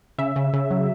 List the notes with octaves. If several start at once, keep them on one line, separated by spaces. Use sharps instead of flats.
C#3 E5
C#3
C#3
F#3